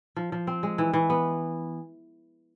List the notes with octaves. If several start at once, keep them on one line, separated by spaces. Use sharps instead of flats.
F3
F3
C4
G#3
E3
E3
B3